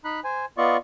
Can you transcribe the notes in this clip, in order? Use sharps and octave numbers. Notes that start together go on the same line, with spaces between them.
D#4 B5 F#6
C5 G#5
B3 F4 D5 D#5 C#6